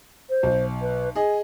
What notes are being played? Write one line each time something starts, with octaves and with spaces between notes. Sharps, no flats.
C5
B1
B4
G#4 D#5 G#5